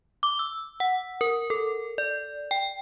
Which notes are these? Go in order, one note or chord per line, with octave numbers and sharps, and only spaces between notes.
D6
E6
F#5
A#4
A4
D5
G5